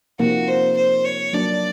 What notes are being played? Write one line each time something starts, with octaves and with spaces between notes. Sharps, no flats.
C3 F3 A#3 D#4 F#4
C5
C5
C#5
F#3 A#3 D4 D5